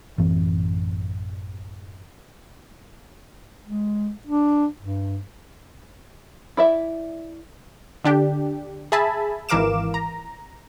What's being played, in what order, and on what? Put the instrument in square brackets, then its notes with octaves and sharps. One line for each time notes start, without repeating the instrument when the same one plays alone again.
[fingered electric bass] A1 F#2 E3 C4
[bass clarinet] G#3
D4
G2
[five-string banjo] E4 D5 E5
[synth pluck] D3 D4 G4
G#4 E5 G#5 A5 B5
G#1 E3 A#4 F5 D6 E7
A#5